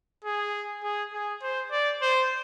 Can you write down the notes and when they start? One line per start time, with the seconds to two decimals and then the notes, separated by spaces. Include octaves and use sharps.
0.25 G#4
0.84 G#4
1.13 G#4
1.42 C5
1.72 D5
2.02 C5